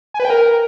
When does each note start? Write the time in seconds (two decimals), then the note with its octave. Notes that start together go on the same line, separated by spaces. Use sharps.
0.14 G#5
0.20 B4
0.25 G5
0.30 A#4